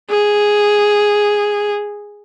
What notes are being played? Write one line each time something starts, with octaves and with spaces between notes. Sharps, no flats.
G#4